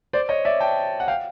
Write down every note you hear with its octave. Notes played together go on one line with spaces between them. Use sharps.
C5 D5
C#5 D#5
D5 E5
G5 A5
F#5
F5 G5